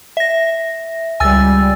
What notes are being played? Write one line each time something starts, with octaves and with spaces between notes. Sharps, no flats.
E5 A#6
C#2 G3 G#5 E6 A6